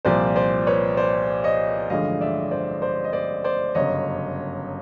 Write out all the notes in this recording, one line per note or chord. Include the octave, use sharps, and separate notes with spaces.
C2 A#2 F3 C5 D5
C5 D5
B4 C#5
C5 D5
C#5 D#5
A1 G2 D3 F3 G#3 D#5 F5
D5 E5
C5 D5
C5 D5
D#5
C5 D5
C5 D5
G1 F#2 C#3 C#5 D#5